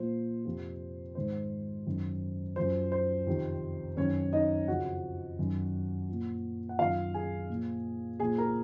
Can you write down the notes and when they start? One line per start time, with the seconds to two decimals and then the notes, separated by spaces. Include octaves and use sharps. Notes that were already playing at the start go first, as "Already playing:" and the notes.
Already playing: A#2 F3 C5
0.45 F2 C3 F3
1.15 G#2 D#3 C5
1.87 F#2 D#3
2.56 F#2 F3 C5
2.92 C5
3.27 F2 C3 D#3
3.97 F#2 D#3 C#4 C#5
4.33 D#4 D#5
4.68 F2 C#3 F3 F#4 F#5
5.39 F#2 D#3
6.09 A#2 F3
6.69 F#5
6.79 D#3 F4 F5
6.84 F#2
7.14 G#4 G#5
7.50 A#2 F3
8.20 A#2 F3 G#4 G#5
8.38 A#4 A#5